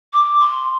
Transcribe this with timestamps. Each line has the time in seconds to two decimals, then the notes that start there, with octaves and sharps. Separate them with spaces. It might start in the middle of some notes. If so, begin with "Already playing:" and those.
0.13 D6
0.40 C6